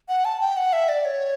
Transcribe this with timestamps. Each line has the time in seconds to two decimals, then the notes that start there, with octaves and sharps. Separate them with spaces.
0.09 F#5
0.25 A5
0.41 G5
0.57 F#5
0.73 E5
0.89 D5
1.05 C#5